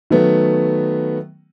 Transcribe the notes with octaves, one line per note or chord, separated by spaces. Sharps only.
D#3 F#3 A3 B3